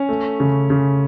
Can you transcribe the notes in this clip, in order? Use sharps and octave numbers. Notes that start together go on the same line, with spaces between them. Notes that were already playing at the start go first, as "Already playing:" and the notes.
Already playing: C#4
A3
C#3
C#3